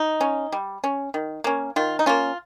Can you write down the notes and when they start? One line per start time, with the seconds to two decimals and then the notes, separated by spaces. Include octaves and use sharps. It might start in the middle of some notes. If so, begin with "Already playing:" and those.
Already playing: D#4
0.21 C#4
0.52 G3
0.84 C#4
1.14 D#3
1.44 A#3 C#4
1.76 D#3 F4
1.99 D#4
2.06 A#3 C#4 F4